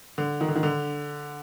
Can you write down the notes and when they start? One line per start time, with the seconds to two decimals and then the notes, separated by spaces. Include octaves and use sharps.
0.18 D3
0.41 D#3
0.48 D3
0.56 D#3
0.63 D3